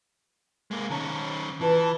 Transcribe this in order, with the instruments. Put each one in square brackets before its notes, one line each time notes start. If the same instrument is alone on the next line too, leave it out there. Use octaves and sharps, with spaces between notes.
[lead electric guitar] G#3 A#3
[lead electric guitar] D#3 C#4 [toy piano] A5 A#5
[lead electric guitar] E3 [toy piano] F4 B4 [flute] A5